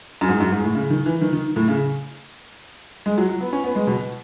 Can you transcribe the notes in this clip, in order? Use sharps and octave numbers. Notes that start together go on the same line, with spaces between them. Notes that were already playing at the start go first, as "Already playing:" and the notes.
F#2
G#2
F#2
G#2
A2
C#3
D#3
E3
D#3
D#3
A2
C#3
G#3
F#3
F#3
B3
C#4
B3
G#3
B2